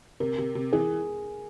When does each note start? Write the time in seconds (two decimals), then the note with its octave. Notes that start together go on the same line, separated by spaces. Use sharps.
0.20 C3 A#4
0.38 C3
0.55 C3
0.73 E3 G#4